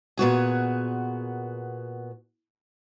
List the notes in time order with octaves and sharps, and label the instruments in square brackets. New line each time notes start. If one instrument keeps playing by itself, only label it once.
[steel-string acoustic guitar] A#2 B3 F#4 G#4